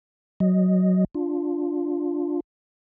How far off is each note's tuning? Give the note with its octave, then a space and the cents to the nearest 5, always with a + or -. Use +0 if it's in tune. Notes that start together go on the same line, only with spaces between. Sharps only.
F#3 +5 D#5 +0
D4 +0 F4 +5